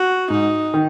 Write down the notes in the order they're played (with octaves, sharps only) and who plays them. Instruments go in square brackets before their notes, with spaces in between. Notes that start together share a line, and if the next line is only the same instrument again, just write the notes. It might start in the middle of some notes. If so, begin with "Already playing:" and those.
Already playing: [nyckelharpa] F#4
[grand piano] G#2 [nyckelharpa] D#4
[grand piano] D#3